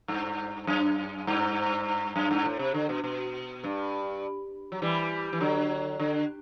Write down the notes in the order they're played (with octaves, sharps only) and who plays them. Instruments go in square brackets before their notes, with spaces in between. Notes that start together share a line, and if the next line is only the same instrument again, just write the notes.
[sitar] G2
F#2
G2
F#2
G2
A2
C3
D3
B2
B2
G2
F#3
E3 G3
E3
D3 F#3
D3